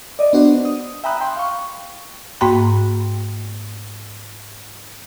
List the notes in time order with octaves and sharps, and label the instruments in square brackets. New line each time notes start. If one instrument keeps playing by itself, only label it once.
[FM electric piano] D5 D#5
B3 D4 F#4 C5
D#6
E5 G5 A#5 B5 D#6 F#6
G5 C6
F5 C#6
[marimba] G#2 A#3 F#4 G5 B5